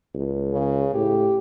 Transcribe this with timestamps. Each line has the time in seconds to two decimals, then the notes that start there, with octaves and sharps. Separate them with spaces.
0.15 C#2
0.53 C#3
0.94 A2 G4